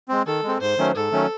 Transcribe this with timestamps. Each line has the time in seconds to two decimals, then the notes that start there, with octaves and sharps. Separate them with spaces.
0.09 G#3 C4
0.27 D#3 A4
0.44 G#3 C4
0.61 G#2 C5
0.78 D#3 F#3 A3 C#4
0.95 G#2 A4
1.12 D#3 F#3 A3 C#4